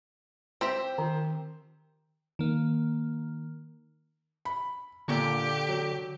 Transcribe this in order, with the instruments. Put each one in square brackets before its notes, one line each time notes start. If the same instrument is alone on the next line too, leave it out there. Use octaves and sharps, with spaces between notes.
[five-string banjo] C4 G4 E5 [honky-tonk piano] C5
[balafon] D#3
[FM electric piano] D#3 A#3
[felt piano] B5
[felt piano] A#2 A#3 [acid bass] D3 [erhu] G4
[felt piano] F#3